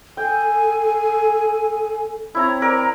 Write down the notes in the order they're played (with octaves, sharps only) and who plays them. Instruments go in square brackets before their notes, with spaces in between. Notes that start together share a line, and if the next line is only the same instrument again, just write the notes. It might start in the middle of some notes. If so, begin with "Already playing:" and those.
[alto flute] A4 [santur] G5 [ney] G#5
[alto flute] C4 [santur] E4 C#5 A#5
[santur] A#4 D5 [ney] A#5